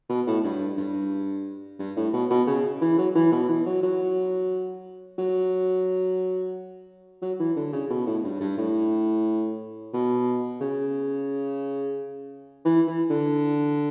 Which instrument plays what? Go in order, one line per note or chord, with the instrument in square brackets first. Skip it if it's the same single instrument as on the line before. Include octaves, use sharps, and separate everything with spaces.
[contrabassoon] B2
A2
G2
G2
G2
A2
B2
B2
C#3
E3
F#3
E3
B2
E3
F#3
F#3
F#3
F#3
E3
D3
C#3
B2
A2
G2
G2
A2
B2
C#3
E3
E3
D3